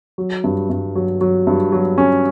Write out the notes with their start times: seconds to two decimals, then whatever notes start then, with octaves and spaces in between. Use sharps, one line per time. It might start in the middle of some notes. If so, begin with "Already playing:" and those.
0.18 F#3
0.44 G2
0.70 G2
0.95 F#3
1.21 F#3
1.47 G2
1.72 F#3
1.98 C#4